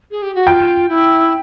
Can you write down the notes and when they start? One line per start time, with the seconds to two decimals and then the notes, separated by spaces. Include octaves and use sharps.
0.11 G#4
0.22 G4
0.35 F#4
0.47 F4 G5
0.89 E4